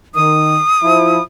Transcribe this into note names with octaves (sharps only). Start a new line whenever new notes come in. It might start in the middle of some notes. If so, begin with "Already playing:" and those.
D#3 D#6
F3 E4